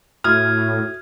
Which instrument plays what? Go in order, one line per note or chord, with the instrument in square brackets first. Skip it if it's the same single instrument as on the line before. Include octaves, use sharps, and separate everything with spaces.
[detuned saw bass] A2 [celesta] F#4 E5 [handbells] D#6 G#6 [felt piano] F6